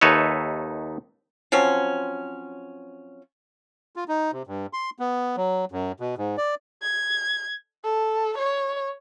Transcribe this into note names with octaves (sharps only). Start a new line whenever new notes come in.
D#2 D#4 A4 B4 C#5 E5
F3 F#3 C4 C#4
F4
D#4
C3
G2
C6
B3
F#3
F#2
B2
G#2
D5
G#6
A4
C#5